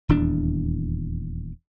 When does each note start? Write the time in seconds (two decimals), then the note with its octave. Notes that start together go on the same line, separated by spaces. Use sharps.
0.09 D#1 E2 D4